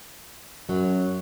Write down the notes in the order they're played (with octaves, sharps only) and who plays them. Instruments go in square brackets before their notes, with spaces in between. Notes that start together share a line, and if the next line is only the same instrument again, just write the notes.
[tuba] F#2 [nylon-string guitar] F#3